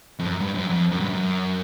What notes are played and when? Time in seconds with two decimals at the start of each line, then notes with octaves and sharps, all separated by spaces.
0.19 F2
0.26 F#2
0.40 G2
0.55 F#2
0.69 F2
0.91 F#2
1.00 G2
1.09 F#2